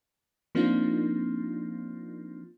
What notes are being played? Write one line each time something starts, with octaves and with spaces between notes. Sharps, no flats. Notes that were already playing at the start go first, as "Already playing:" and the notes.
F3 A#3 C4 D4 D#4 F4